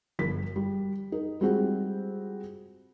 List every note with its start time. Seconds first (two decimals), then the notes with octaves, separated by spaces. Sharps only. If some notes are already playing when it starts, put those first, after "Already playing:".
0.19 G1 F3 A#4 B6
0.56 G3
1.12 D#4 A#4
1.41 G3 G#3 C4 F4 F#4 G#4